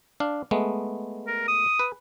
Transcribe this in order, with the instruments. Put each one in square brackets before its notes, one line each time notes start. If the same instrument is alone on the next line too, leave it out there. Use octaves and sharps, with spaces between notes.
[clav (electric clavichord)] D4 F5
G#3 A3 B3
[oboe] A#4
D#6
[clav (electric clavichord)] B4